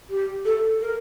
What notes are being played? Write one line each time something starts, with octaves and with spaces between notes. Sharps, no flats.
G4
A4
A#4